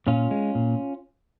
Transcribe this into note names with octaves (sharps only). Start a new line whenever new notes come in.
A#2 C#4 F4
G#3
A#2